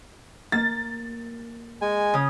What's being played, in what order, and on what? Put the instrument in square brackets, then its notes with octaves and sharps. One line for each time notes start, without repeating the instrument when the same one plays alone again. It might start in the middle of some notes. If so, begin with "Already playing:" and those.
[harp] A#3 [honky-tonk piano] A6
[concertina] G#3 G#5
[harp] C#3 D#6